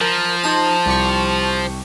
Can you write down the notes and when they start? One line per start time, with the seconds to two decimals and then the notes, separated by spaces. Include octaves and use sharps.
0.01 F3 A#4
0.44 D#4 C5 A5 A#5 D#7
0.86 C2 G4 C#6